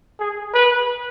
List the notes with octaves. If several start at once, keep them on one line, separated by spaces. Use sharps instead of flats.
G#4
B4